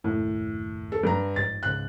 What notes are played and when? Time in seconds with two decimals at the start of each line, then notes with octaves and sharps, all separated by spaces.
0.04 F#1 D#2 A2
0.92 A4
1.03 G2 A#5
1.36 A#1 G#2 A6
1.63 C#2 G#2 C#3 F#6